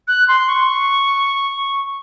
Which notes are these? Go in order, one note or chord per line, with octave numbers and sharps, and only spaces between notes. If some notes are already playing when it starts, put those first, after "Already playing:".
F#6
C6
C#6